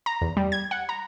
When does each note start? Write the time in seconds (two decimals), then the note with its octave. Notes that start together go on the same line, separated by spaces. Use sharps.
0.06 A#5
0.22 E2
0.37 G3
0.52 G#6
0.71 F#5
0.89 A#5